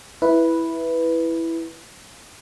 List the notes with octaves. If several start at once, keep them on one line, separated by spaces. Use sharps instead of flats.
E4 B4